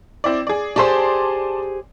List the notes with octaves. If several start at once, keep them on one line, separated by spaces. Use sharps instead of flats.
C4 E4 D5
G#4 D5
G4 G#4 C5 D5 A5 C6